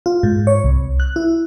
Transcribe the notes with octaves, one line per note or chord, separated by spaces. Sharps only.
F4
G#2
C#5
C2
F#6
E4